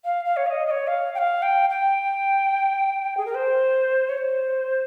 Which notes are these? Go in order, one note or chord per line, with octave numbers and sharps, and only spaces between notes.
F5
F5
C#5
F5
D#5
D#5
C#5
F5
G5
F5
G5
G5
G#4
A#4
C5
C#5
C5